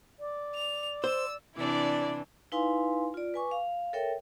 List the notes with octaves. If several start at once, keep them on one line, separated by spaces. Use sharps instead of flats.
D5
F7
C5 E6
C3 E3 D4 E4 D5
D#4 E4 B4 F5 G#5 C6
F4 D5
B4 G#5 C#6 D6
F5
A4 A#4 C#5 E5 G5